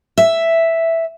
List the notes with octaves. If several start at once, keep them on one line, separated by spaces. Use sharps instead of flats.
E5